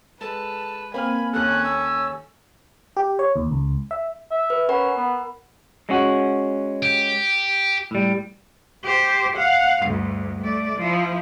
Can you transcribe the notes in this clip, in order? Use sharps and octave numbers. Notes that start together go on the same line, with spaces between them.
G#3 A4 B4 A5
A#3 C4 F5 G#5 B5 F6
D#2 C#4 A4 F#6
E6
G4
C#5
D#2
C#2
E5
E5
B4
C#4 A#4 F#5 B5
B3
G#3 C#4 F#4
G4
A2 G3
G4 C5
F5 F#5
D2 G2
A3 D5
F3 E4